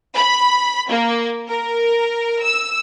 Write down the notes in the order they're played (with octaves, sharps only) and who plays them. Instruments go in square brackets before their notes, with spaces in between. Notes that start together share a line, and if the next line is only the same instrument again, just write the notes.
[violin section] B5
A#3
A#4
E6